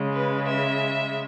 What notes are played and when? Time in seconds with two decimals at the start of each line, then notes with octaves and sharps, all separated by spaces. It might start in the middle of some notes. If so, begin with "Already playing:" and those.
Already playing: C#3 G#3
0.12 B4
0.48 E5